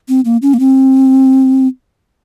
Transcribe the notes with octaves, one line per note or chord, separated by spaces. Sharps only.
C4
A#3
C#4
A#3
C4